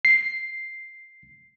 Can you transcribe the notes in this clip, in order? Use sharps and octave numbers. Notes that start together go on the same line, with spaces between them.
C7